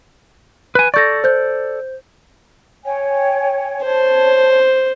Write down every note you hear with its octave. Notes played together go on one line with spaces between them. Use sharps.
B4 G#5
A4 D5 C#6 G6 A#6
C5 G6
C#5 G5 G#5
C5 C#5 A5